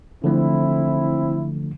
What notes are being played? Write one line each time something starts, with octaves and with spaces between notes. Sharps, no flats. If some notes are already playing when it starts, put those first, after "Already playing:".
D3 F3 A3 C4 E4